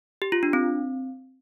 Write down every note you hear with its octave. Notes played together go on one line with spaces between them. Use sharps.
G4
F4
D4
C4